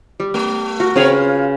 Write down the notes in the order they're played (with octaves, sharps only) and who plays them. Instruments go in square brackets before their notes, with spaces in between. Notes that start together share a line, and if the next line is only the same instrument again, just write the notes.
[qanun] G3
[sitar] A3
[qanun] F#4 A#4
[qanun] C#3 G#4 B4 [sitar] C4 C#5
[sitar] F4